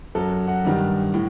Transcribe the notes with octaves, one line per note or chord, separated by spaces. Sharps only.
F#2 F#3 A4
F#5
G2 D#3 G3
A2